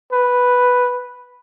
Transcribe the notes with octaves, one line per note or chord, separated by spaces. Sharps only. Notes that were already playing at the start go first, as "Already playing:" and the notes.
B4